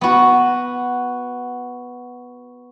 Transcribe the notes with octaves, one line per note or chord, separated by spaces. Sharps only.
B3 F#4